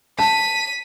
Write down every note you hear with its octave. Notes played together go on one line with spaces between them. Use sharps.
A5 B6 D#7